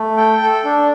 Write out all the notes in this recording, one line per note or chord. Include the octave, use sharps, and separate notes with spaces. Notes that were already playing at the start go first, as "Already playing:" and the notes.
Already playing: A3
A4 G5
A4
D4